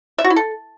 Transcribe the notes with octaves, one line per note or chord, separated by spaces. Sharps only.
E5
F#4
E4
A4